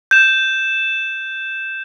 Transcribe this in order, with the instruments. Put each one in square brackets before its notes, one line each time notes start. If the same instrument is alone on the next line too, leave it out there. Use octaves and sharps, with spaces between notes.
[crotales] G6 E7